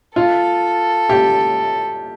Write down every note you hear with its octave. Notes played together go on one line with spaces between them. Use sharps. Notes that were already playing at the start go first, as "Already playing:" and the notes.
F4 A4
G4